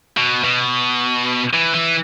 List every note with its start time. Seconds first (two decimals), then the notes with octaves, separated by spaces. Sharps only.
0.17 B2
0.44 B2
1.53 E3
1.74 E3